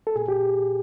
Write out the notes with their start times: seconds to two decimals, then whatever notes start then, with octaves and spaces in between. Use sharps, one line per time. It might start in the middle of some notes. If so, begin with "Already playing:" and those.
0.07 A4
0.16 A#2 G#4
0.28 G4